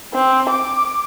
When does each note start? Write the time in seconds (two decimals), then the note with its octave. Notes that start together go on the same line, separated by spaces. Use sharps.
0.14 C4
0.50 D6